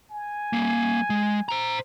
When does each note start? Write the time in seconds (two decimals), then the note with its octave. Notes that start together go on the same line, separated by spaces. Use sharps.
0.11 G#5
0.53 G3 A#3
1.10 G#3
1.49 C5 A#5